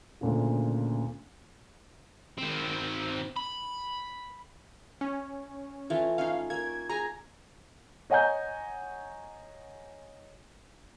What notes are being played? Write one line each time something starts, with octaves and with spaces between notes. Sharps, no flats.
D2 A#2 C#3
D#3 C4
B5
C#4
E3 A3 F4
C#4 D#4 F5
A#3 G#6
G#4 G#5 A#5
C#5 D#5 F#5 G#5 A#5 G6